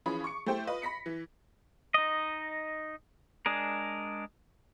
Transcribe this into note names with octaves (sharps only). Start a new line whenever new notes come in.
E3 F3 C#4 G#4 B5
C#6 D6 C#7
A3 E4 G4 C5 G5
F4 B4 D#5
B5 A#6 B6 C#7
E3
D#4 D#5
G#3 D4 G#4 A#4